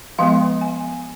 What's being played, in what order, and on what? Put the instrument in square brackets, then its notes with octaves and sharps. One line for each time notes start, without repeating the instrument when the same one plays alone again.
[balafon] F3 G#3 B3 F5
G#5